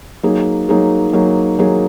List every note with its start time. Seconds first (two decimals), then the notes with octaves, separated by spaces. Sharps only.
0.23 F#3 A#3 D#4 G#4
0.69 F#3 A#3 D#4 G#4
1.13 F#3 A#3 D#4 G#4
1.59 F#3 A#3 D#4 G#4